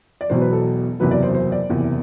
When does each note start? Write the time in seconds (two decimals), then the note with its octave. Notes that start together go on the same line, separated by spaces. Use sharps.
0.21 D5
0.30 E1 E2 B2 F#3 C5
0.41 B4
0.53 A4
1.00 F#1 E2 C3 F#3 B4
1.11 D5
1.22 C5
1.34 C5
1.52 D5
1.70 F#1 E2 C3